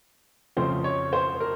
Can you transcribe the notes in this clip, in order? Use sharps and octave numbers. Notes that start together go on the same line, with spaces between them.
F2 C#3 F3 A3 C5
C#5
C5
A#4